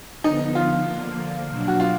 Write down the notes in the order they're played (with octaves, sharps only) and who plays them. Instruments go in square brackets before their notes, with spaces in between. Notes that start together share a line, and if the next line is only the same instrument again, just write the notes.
[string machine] D3 F3 B3 [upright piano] D#4
[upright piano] F4
[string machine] D3 F3 A#3
B2 F#3 A#3 D4
[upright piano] F#4
F4